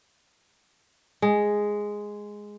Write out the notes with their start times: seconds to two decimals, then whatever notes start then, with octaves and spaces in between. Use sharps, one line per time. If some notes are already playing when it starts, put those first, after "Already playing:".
1.22 G#3